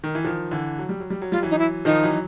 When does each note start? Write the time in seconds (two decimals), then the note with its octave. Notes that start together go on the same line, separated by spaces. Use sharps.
0.04 D#3
0.15 E3
0.25 D#3 F3
0.51 D3 E3
0.79 F#3
0.89 G3
1.00 F#3
1.10 G3
1.22 F#3
1.32 G3 F4
1.42 E3 F#3
1.51 D#4
1.59 E4
1.85 D#3 F3 D#4
2.03 E3 F#3